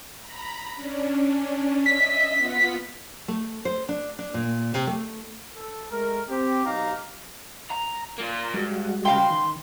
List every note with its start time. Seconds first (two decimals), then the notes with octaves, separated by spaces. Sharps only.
0.20 A#5 B5
0.75 C#4 D4
1.86 D#5 E5 B6
2.37 B3 F4 F#5
3.28 A3
3.65 C5
3.89 D4
4.19 D4
4.34 A#2
4.74 C3
4.87 A3
5.55 A4
5.91 G#3 A3 A#4
6.30 C4 G4
6.66 B1 D#4 G4 F5 A#5
7.71 A#5
8.18 A#3 F4 A#5
8.54 G2 G3 G#3 F#4
9.05 C#3 F5 G5 C6
9.30 D#3